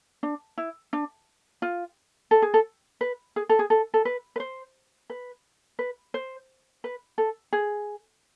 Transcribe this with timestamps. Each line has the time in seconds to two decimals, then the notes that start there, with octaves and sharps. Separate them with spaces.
0.23 D4
0.58 E4
0.93 D4
1.62 F4
2.31 A4
2.42 G#4
2.54 A4
3.01 B4
3.36 G#4
3.49 A4
3.59 G#4
3.70 A4
3.94 A4
4.05 B4
4.36 B4
4.40 C5
5.10 B4
5.79 B4
6.14 C5
6.84 B4
7.18 A4
7.53 G#4